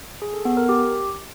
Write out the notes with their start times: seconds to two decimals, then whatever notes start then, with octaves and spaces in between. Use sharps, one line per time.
0.22 G#4
0.34 A4
0.45 B3
0.57 A#4
0.69 G4